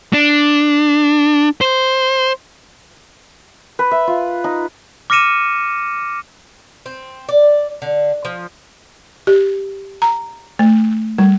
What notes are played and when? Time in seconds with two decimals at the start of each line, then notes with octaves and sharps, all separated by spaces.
0.13 D4
1.61 C5
3.79 B4
3.91 E5
4.07 F4
4.44 D#4
5.10 D6 F6 A#6 C#7 D#7 E7
6.86 C4
7.29 D5
7.82 D3
8.25 F3
9.27 G4
10.02 A#5
10.59 A3
11.18 G3